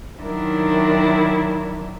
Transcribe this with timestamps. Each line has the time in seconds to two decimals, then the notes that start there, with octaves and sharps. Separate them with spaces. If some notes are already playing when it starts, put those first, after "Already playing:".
0.22 D#3 F#3 D4 E4 A#4